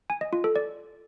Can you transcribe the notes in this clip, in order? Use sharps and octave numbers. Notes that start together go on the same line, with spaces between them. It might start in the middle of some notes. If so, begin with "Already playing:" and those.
G#5
D#5
F4
A4
D5